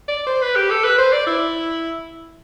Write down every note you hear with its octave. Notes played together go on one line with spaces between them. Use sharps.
D5
C5
B4
G4
A4
B4
C5
D5
E4